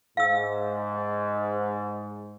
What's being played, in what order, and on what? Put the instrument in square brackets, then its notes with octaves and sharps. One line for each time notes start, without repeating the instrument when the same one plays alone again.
[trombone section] G#2 [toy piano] F5 E6